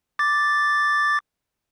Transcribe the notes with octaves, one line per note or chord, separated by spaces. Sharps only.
D6 A6